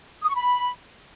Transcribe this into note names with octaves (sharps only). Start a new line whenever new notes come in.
D#6
C#6
B5